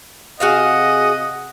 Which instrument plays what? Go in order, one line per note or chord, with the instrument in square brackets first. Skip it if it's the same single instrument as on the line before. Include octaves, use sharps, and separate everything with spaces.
[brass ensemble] C3 F#5 [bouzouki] F#4 G#4 F5 [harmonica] D#5